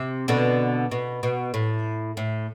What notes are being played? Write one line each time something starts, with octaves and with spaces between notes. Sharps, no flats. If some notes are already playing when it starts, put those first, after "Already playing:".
Already playing: C3
B2 D3
B2
B2
A2
A2